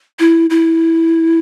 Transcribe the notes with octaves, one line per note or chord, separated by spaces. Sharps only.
E4
E4